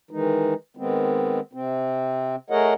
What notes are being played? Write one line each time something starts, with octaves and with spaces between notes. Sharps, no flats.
D#3 E3 G#3 D#4
D#3 G#3 B3 C4
C3 C4
A3 G#4 A#4 C#5 D#5 F#5